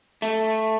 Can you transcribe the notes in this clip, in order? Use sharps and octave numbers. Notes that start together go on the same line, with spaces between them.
A3